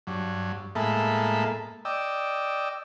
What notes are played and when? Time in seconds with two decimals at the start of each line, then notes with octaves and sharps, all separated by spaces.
0.07 G2 F#3
0.75 A2 G#3 A#3 A4 E5 B5
1.85 D5 D#5 G5 E6